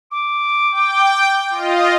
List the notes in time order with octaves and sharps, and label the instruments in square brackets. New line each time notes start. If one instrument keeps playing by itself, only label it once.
[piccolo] D6
[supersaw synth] G5
F4 D#5